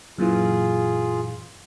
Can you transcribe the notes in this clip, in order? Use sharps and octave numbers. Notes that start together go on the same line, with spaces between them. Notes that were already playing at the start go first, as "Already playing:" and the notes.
F#2 A#2 E3 F4 G#4